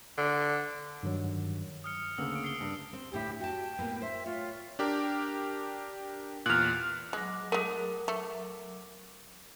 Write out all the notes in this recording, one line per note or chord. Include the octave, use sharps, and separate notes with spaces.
D3
G2 D#3 F#3
D#6 F6 C#7
D2 C#3 A#3 E6
C#7 D7
C7 G7
G2
C4
D2 A2 E4 G4
F#4 G5 A5
A2 A#3 B3
C5 E5
F4 C#5
D4 G4 A#4
E2 A#2 F6 F#6
F#3 G#3 D6
G#3 A3 A#4
A3